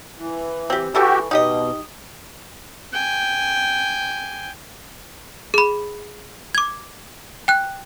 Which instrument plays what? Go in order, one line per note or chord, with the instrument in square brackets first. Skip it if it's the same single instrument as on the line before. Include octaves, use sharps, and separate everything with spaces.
[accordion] E3
[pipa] C4 G4
[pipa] E3 A4 C#6 [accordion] F#4 G4
[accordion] B2 [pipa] D#4 G4 D#5
[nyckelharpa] G5 G#5
[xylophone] G#4 B5
D6 G#6
G5 F#6